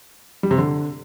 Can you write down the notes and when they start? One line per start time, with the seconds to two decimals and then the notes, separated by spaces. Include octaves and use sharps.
0.43 G3
0.51 C3
0.58 D3